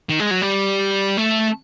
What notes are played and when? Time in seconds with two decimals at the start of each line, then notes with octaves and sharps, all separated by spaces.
0.09 D#3
0.20 G#3
0.31 F#3
0.42 G3
1.18 A3